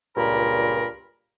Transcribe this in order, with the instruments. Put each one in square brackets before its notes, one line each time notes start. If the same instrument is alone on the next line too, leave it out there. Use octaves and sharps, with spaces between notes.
[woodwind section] C#2 G2 A#2 A#4 B5